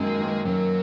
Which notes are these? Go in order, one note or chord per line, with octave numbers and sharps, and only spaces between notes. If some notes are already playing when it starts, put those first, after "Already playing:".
Already playing: F#2 D#3 G#3 A#3
D#3 A#3
F#2 F#3